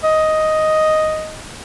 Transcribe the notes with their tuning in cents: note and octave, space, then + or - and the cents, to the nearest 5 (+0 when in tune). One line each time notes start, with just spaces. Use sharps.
D#5 +5